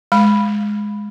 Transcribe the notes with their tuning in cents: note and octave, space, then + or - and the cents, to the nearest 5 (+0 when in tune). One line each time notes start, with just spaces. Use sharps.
G#3 +0 B5 +0